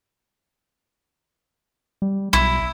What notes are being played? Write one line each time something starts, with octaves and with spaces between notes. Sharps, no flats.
G3
B1 E4